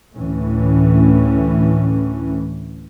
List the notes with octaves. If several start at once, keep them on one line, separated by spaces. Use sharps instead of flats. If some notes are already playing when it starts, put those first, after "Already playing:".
D2 A2 E3 C#4